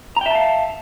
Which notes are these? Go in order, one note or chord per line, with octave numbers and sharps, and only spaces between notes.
E5 F5 G5 A5 A#5